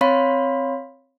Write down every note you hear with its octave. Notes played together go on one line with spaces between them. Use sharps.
C4 C#5 F5 B5 C6 B6